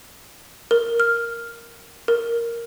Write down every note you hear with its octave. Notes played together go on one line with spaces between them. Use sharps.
A#4
F6
A#4